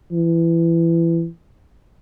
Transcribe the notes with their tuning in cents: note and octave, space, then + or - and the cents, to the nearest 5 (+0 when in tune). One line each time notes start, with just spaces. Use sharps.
E3 +20